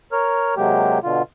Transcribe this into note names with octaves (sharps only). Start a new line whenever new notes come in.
A#4 C#5 F6
C3 F#3 G#3 A#3 G4
B2 D3 F4